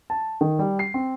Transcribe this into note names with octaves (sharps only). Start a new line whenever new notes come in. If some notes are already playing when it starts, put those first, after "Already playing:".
A5
D#3
G3
C7
C4